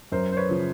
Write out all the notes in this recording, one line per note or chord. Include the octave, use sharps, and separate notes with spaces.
F#2 A#4 C5
C5
B4 C#5
C#3 F3